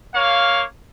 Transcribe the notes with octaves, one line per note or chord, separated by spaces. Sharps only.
A#3 C#5 F5